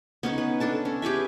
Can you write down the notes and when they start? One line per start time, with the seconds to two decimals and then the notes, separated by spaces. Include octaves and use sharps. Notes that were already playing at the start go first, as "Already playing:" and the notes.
0.23 B3 C#4 D#4
0.38 B4
0.60 D4 A4 A5
0.85 C#4
1.02 G4 G#4 B4 E5